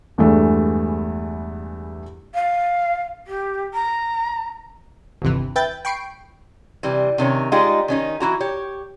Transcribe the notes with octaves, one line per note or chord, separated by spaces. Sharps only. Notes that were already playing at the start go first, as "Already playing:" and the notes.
E2 G2 E3 G#3 A3 B3
F5
G4
A#5
G1 D#2 C3 E3
B4 E5 G5 G6 A6
G5 B5 C#6 C7 D7
C3 E3 G3
C3 D#3 C#4 C#5
G3 G#3 D#4 F4 G4
D#3 C#4 D#4
E3 E4 F#4 A#5
G4 C#5